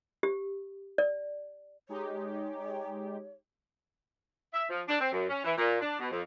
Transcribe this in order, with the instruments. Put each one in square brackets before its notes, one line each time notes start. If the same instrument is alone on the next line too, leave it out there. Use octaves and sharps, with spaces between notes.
[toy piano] G4
D5
[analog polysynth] G#3 D#4 G4 [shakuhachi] C#5
[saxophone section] E5
F3
D4
C4
F#2
C#4
E3
A#2
D4
B2
F2